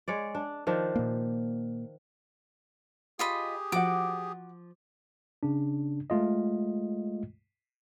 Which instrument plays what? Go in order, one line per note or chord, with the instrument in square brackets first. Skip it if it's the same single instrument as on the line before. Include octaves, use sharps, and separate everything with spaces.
[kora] G#3 C#5 D5
D4
D#3 F3 D4
[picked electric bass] A#2 A#3
[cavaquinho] F4 D#5 B5 [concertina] G4 G#4
[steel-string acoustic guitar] F3 [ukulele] F#4 F#5 [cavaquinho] D6
[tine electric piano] C#3 D4
G#3 A3 F4 D#5